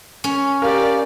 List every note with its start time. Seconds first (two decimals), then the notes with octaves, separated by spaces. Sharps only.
0.24 C#4
0.62 G4 A#4 D5 F5